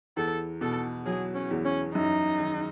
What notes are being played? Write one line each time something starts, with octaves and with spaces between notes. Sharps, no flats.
E2 A4
B2 A4
F#3 G#4
C#4
E2
C#4
F#2 D#4
D#3